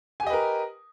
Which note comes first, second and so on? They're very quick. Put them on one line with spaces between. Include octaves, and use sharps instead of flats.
G#5 G4 D#5 B4 A#4